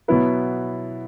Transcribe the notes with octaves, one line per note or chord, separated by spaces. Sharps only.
B2 F#3 B3 E4 B4